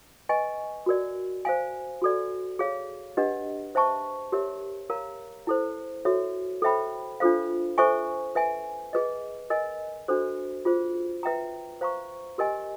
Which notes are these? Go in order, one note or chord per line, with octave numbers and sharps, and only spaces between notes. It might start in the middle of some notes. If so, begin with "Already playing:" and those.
B4 D#5 G#5 C#6
F#4 A#4 D5
C5 F5 G#5
F#4 A4 D5
G#4 C#5 F5
D4 G4 B4 D#5 F#5
C5 E5 A5 C#6
G4 A#4 C#5 E5
A#4 C#5 F5 A#5
E4 A4 C5
F#4 A4 C#5 E5
A4 C5 E5 G5 B5
D4 F4 A4 C5 F5
A4 C5 E5 G#5 C#6
B4 E5 G#5
G#4 B4 D#5
A#4 D#5 G#5
D4 F#4 A4 C5
F4 G#4 C5
B4 E5 G5 A#5
C5 F5 A#5 C#6
G4 A#4 D#5 G#5